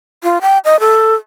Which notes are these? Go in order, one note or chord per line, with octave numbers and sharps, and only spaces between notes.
F4
G5
D#5
A4